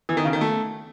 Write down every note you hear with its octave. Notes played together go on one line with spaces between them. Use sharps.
E3
D#3
C#3
D#3
A3